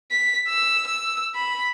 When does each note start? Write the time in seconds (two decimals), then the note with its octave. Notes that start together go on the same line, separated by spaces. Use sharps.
0.11 B6
0.48 E6
0.87 E6
1.35 B5